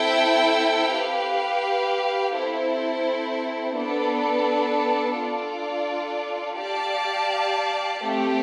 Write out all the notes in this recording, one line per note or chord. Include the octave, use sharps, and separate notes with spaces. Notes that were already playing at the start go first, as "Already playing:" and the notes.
Already playing: C4 E4 A4 E5 G5
G4 B4 F5
C4 E4 A4 C5
B3 D4 A4
D4 F4 A4 D5
G4 D5 F5 A5
A3 C4 G4